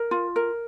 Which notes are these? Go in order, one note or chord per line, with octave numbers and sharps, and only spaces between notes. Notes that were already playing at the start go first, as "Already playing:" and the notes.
Already playing: A#4
F4
A#4